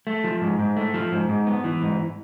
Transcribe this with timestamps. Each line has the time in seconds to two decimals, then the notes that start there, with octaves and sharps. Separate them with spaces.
0.07 A3
0.24 F3
0.41 G#2
0.59 G#2
0.77 A3
0.94 F3
1.12 G#2
1.29 G#2
1.47 B3
1.64 E3
1.82 G#2